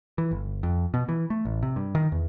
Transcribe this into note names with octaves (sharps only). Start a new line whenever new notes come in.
E3
G1
F2
B2
E3
A3
A1
C3
G2
D#3
E2